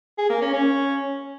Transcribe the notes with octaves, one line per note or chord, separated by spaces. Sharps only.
G#4
A#3
C#4
C#4